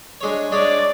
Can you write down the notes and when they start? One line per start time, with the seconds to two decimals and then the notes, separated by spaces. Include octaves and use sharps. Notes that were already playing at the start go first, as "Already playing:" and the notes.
0.21 G#3 D4 G#4 C#5
0.52 G#3 D4 G#4 C#5 D5